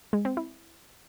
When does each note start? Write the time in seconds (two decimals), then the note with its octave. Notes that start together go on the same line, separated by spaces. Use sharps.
0.13 G#3
0.25 C4
0.37 E4